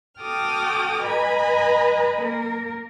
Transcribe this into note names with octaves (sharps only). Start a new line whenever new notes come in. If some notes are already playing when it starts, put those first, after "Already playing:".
F#4 A4 G5 D6 D#6 F6
B4 D#5 G#5 A#5 B5
A#3 A#4